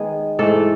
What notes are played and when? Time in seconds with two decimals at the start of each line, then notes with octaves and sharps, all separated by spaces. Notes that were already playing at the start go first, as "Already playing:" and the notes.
Already playing: D#3 G#3 B3 G#4
0.39 G#2 E3 A3 A4